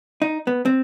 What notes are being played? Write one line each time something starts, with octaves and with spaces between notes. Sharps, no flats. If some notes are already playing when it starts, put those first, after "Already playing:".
D#4
B3
C4